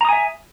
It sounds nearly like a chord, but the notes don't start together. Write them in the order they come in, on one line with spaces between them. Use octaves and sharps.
A#5 D#6 G#5 E5